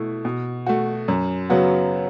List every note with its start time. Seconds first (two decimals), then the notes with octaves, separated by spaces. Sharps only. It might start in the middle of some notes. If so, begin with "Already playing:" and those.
Already playing: B2 A3 E4
0.25 B2
0.66 A3 F#4
1.08 F#2
1.49 C#3 F#3 B3 F#4